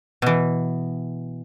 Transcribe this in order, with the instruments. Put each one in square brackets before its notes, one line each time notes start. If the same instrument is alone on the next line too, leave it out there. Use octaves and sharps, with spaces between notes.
[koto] B2 E3